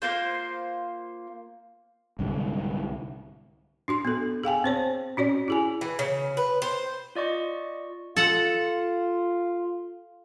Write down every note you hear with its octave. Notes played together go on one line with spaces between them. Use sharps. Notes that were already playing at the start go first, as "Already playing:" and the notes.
A#3 F4 C5
C2 G#2 D3
D4 F#4 C6
B3 A4
G#4 F5 G5 G#5
C4 C5 C#5
C#4 F#4 C#5 D5
E4 G#4 G#5
E3
C#3
B4
C5
F4 D5 D#5 C#6
F4 A4 F#5